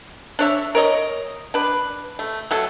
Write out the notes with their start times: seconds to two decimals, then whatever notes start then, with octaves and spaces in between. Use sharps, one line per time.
0.39 D4 C#5 E5
0.75 A#4 C#5 D#5
1.54 D4 B4
2.19 A3
2.51 F#3 A3 A4